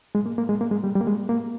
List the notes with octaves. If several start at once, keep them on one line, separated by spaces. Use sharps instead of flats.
G#3
A#3
A#3
G#3
A#3
G#3
G3
G3
A#3
G#3
A#3